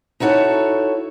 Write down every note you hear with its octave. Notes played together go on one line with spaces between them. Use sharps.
D#4 E4 F#4 A4 C#5